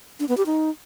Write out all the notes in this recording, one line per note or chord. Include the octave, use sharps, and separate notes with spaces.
D4
B3
G4
D#4